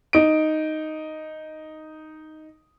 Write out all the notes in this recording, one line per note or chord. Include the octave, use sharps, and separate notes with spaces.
D#4 D7